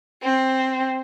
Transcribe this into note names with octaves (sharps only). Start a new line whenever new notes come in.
C4